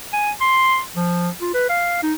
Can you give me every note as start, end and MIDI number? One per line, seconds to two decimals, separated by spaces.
0.13 0.31 80
0.41 0.81 84
0.96 1.29 53
1.41 1.52 65
1.54 1.65 71
1.70 2.02 77
2.03 2.14 63